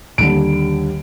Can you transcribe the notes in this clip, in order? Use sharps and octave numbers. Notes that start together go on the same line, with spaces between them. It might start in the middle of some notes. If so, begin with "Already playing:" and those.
D#2 D3 G3 D7